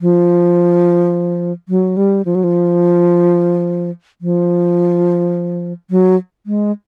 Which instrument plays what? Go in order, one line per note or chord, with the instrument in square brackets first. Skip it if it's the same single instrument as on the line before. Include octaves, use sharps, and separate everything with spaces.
[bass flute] F3
F#3
G3
F3
F#3
F3
F3
F#3
G#3